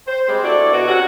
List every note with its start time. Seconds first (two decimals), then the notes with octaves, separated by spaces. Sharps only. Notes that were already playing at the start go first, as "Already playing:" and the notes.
0.07 C5
0.28 G3 G#3 C4
0.43 D4 E4 F#4 A4 D5
0.73 B2 F#4
0.88 C3 C#4 F#4